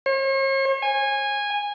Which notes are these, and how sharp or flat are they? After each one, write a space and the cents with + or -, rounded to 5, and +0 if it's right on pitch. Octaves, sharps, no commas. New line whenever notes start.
C#5 -45
G#5 -15